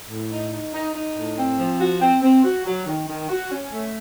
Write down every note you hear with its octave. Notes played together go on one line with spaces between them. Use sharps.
A2
D#4
D#4
D#4
D#4
A2
C4
F3
F#4
C4
C4
F#4
F#3
D#3
D#3
F#4
C#4
A3